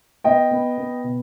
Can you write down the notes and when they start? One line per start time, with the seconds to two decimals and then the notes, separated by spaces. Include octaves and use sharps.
0.24 B3 D#5 G5
0.51 B3
0.78 B3
1.04 B2